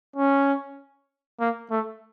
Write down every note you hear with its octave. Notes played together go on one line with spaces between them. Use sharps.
C#4
A#3
A3